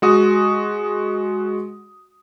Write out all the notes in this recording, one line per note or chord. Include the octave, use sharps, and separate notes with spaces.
G#3 F#4 D#6